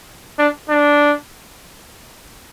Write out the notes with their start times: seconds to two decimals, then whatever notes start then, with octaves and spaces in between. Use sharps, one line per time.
0.39 D4
0.69 D4